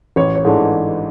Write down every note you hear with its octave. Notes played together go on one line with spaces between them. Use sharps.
A1 C#5
C#5
G#2 E3 A3 D4
D#5